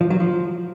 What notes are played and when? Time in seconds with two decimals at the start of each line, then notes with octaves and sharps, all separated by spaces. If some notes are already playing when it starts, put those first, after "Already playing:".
0.01 F3
0.10 F#3
0.20 F3